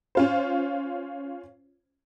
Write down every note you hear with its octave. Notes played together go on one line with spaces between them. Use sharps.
C#4 F4 C5